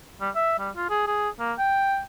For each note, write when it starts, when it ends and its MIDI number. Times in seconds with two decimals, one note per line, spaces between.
0.21 0.30 55
0.35 0.57 76
0.59 0.70 55
0.76 0.86 65
0.90 1.07 68
1.07 1.29 68
1.40 1.53 58
1.59 2.01 79